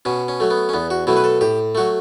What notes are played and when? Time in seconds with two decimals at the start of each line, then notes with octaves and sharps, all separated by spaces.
0.05 B2 C#4
0.28 C#4
0.40 F#3 A3
0.50 B3
0.69 C#4
0.74 E2 B3
0.90 F#4
1.07 B2 F#3 A3 E4
1.17 B4
1.24 A4
1.41 A2 G4
1.75 F#3 A3 F#4